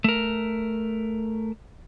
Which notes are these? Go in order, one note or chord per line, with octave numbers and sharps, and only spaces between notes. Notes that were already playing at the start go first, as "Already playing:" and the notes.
A3 A#4